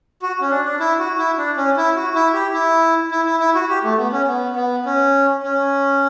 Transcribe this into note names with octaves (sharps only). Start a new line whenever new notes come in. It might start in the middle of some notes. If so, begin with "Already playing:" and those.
F#4
C#4
D4
D4
E4
F#4
E4
D4
C#4
E4
F#4
E4
G4
E4
E4
E4
E4
F#4
G4
A3
B3
C#4
B3
B3
C#4
C#4